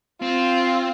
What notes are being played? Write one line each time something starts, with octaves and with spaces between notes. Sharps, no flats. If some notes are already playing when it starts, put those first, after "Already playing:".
C4 F4